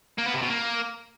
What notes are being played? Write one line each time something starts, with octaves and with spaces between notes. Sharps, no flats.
A#3
B3
C3
B2
A#3